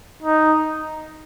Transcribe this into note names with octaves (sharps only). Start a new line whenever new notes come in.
D#4